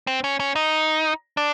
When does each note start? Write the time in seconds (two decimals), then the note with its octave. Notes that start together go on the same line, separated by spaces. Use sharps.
0.07 C4
0.24 C#4
0.40 C#4
0.56 D#4
1.37 D4